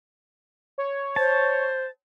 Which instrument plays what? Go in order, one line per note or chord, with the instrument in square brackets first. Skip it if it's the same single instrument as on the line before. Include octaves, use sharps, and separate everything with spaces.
[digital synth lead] C#5
[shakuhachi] C5 [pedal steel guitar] A5